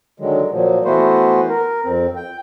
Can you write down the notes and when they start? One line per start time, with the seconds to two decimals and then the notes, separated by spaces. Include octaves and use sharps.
0.20 D3 D#3 F#3 G#3
0.51 A#2 F3 F#3
0.85 E3 A3 B3 F#4 B4 C5
1.49 A#4
1.85 F2 C4
2.16 G5